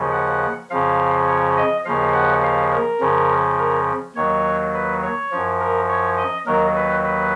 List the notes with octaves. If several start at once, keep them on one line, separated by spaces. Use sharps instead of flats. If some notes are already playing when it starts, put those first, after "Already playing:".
Already playing: D#2 C#3 F3
F#5
F2 C#3 F3 F5
C#5
D#5
D#2 C#3 F3 F5
F#5
F5
A#4
F2 C#3 F3
A#4
D#2 D#3 F#3 C#5
B4
C#5
F#2 F3
A#4
C#5
D#5
D#2 D#3 F#3 A#4
B4
B4